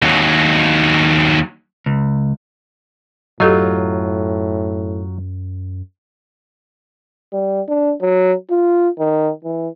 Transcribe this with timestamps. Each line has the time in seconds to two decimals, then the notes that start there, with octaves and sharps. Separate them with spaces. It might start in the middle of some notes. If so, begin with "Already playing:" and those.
0.02 D#2 F#3
1.86 C#2
3.40 F#2 A2 F#3 F4 G4 A4 D#5
7.33 G3
7.68 D4
8.02 F#3
8.50 F4
8.99 D#3
9.44 E3